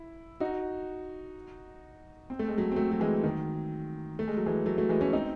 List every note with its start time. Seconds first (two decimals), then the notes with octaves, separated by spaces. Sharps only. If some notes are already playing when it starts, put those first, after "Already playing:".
Already playing: E4
0.40 D#4 F#4
2.30 C4
2.39 A3
2.48 G#3
2.58 F#3 A3
2.72 C4
2.76 F#3 A3
2.92 F#3
3.00 E3 G#3
3.24 D#3 F#3
4.19 A3
4.28 G#3
4.37 F#3
4.46 E3 G#3
4.66 F#3 A3
4.78 F#3 A3
4.89 E3 G#3
5.01 A3 C#4
5.13 C4 D#4